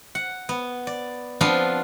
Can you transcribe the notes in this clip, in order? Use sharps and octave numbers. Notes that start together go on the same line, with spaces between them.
F#5
B3
D5
F3 B3 C4 D4 F4